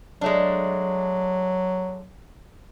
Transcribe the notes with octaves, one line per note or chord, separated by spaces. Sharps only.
F#3 G#3 A3 D4